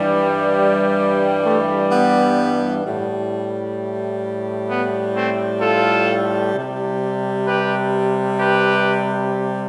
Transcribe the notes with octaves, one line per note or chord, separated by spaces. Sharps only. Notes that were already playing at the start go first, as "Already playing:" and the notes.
Already playing: G2 E3 G3
A3
B3
A2 G3
B3
A3 C4
F4 A4
C3 G3
G4 B4
G4 B4